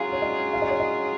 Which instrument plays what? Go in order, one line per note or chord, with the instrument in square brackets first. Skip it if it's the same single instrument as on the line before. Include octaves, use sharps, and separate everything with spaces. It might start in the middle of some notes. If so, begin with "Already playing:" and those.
Already playing: [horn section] F#3 C#4 F4 G#4 [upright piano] F5
[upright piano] C#5
D#5
F5
D#5
C#5
D#5